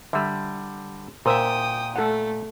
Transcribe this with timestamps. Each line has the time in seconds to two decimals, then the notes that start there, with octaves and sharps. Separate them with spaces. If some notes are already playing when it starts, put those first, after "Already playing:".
0.13 D3 G3 E5
1.26 A#2 A#4 C5 E5 G5 D#6 E6
1.96 A3 A4 F#5